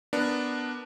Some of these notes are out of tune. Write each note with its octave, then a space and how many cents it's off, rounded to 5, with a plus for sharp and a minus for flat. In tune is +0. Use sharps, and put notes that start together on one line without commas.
B3 +0 D4 +0 A#4 +0